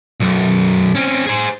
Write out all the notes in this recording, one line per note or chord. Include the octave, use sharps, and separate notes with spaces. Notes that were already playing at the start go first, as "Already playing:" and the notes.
B1 F#2
C4 C#4
G#4 C5